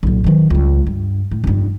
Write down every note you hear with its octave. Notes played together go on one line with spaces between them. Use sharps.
B1 A#2
D#3 F#3
C#2 G3
G2
A2
F1 G2